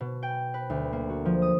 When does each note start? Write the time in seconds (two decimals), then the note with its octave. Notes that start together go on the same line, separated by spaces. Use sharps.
0.01 B2
0.23 G5
0.54 B4
0.70 D2
0.93 A#3
1.10 F#4
1.25 F3
1.42 D#6